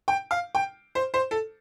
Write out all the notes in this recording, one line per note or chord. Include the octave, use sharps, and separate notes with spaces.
G5
F5
G5
C5
C5
A4